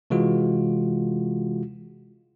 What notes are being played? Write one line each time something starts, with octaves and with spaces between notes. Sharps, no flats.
C3 E3 G#3 F4 F#4